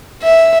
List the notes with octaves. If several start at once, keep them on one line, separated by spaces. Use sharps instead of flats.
E5